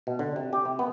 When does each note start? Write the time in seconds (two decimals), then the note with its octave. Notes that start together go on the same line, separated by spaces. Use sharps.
0.07 B2
0.19 D3
0.36 C3
0.53 G4
0.65 C3
0.79 B3